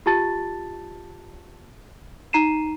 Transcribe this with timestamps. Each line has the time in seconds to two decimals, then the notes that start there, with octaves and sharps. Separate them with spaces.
0.06 F4 G4 A5 A6
2.33 D#4 A#5 C7 D#7 E7